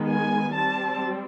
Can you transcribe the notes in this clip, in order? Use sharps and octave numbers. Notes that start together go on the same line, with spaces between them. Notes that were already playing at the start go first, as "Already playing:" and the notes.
Already playing: D#3 G#3 B3
G#5
G3 C4 A5